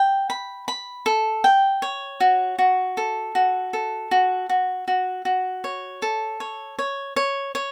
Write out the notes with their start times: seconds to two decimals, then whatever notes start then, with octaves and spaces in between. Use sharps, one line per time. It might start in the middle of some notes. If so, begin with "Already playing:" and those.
Already playing: G5
0.30 B5
0.68 B5
1.06 A4
1.44 G5
1.82 C#5
2.20 F#4
2.59 F#4
2.97 A4
3.35 F#4
3.73 A4
4.11 F#4
4.49 F#4
4.88 F#4
5.25 F#4
5.64 C#5
6.02 A4
6.40 C#5
6.79 C#5
7.16 C#5
7.55 C#5